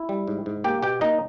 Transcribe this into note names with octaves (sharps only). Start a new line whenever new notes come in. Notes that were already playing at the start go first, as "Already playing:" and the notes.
Already playing: E4
G3
G#2
G#2
A#3 G4 G5
B2 G4 G5
A#3 D#4 D#5